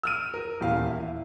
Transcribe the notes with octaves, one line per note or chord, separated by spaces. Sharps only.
E6 F6 D#7
A#4
D#1 E2 F5
E4